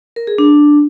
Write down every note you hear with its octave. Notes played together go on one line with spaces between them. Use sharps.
A#4
G#4
D4